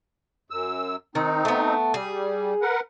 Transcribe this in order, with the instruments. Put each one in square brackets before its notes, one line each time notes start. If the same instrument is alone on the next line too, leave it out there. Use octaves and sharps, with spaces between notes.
[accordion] F#2 E6
[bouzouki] D#3 [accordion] C4 D#4
[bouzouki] A3 B3
[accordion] G3 [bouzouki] G#4
[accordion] A#4 B4 F#5